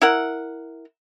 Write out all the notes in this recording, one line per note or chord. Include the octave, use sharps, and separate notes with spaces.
E4 A#4 F#5